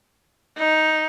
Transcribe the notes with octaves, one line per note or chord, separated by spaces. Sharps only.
D#4